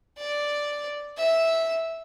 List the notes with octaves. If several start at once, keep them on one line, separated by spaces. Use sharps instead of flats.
D5
E5